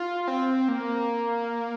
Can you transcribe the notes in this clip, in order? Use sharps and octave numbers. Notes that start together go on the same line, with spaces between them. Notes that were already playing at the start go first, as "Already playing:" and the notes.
Already playing: F4
C4
A#3